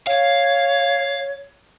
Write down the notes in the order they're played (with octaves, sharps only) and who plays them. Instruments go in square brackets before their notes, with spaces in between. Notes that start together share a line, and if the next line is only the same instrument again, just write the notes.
[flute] C#5 [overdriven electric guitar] F5